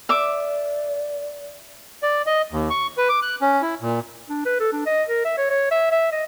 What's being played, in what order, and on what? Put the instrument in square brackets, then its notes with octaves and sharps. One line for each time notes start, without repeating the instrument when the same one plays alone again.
[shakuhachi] D5 [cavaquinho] E5 D6
[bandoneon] D5
D#5
D#2
C#6
B4
D6
F#6
C#4
E4
A#2
[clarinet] D4
B4
A4
D4
D#5
A#4
E5
C#5
C#5
E5
E5
D#5